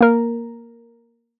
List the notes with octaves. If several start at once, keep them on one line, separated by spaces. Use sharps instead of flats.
A#3 A#4